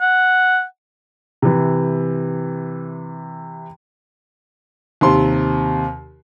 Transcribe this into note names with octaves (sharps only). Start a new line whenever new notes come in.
F#5
C3 E3
D#2 C3 C6